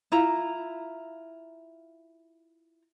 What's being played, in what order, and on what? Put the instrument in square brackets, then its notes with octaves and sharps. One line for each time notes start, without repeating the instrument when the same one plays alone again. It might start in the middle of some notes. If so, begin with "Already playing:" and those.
[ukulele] E4 F4 A#5